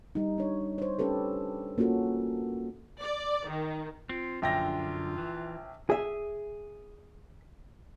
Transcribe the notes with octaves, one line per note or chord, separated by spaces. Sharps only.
G3 D#4
D4 C#5
C5 C#5
C#4 D4 G4 A4 B4
A#3 C#4 F4 F#4 A4
D5
D#3
C4 F4
A#1 F#2 D3 F4 G5 A#6
E3
G#4 E5